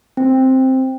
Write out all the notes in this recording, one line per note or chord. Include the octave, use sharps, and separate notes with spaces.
C4